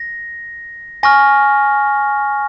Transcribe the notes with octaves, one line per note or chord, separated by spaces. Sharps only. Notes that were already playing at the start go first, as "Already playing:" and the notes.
Already playing: A#6
G#5 C#6 F6 A#6